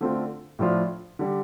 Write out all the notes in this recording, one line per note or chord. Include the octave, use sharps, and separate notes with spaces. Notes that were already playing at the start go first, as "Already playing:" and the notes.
D3 A3 C4 F4
A2 F3 D4 F4
D3 G3